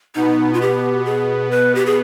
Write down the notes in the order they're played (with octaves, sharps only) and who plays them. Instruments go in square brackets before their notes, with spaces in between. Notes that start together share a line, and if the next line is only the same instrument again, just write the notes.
[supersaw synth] B2 B3 [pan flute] D#4
[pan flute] F4
G4
G#4
B4
G4
G#4